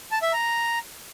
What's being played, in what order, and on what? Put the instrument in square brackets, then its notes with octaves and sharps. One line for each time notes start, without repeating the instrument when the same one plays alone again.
[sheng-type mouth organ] A5
E5
A#5